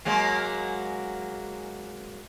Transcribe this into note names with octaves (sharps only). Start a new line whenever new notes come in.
F#3 G#3 A#3